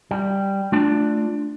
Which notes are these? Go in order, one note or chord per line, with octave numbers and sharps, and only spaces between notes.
G3
A3 D4 F4 D5 A5